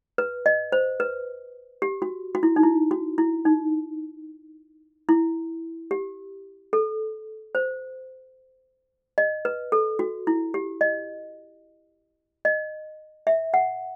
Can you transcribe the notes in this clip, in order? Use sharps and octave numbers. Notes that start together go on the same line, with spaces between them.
B4
D#5
C5
B4
G4
F#4
F#4
E4
D#4
E4
F#4
E4
D#4
E4
G4
A4
C5
D#5
B4
A4
F#4
E4
G4
D#5
D#5
E5
F#5